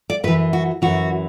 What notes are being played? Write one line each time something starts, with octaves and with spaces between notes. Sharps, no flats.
D5
F#2 E3 B4
F#4
F#2 E3 F#4